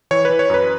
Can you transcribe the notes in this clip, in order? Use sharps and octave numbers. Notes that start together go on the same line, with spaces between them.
E3 C#5
E3 B4
C#5
F#2 B4